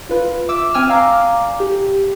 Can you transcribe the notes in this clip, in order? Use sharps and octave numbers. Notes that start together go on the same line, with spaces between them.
F4 B4
E5 D6 E6
C4 G5 G#5 E6 F6
D5 F5 G#5 A#5 D6
G4